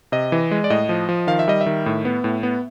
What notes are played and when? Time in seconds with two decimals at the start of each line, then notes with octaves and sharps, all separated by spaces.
0.12 C3 D#5
0.32 E3
0.51 G#3
0.64 D5
0.70 A2 D#5
0.89 F3
1.09 F3
1.27 D#3 F5
1.39 E5
1.48 G3 D#5
1.61 E5
1.66 D#3
1.86 A2
2.05 B3
2.24 A2
2.43 B3